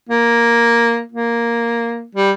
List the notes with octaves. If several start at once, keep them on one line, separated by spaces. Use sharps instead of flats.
A#3
A#3
G3